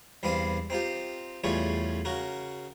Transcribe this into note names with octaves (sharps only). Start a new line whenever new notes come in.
E2 G2 C4 F5 B5 D#6
C4 D#4 F4 G4
E2 A2 G3 F4 G#4 C#5
C#3 F#4 A#4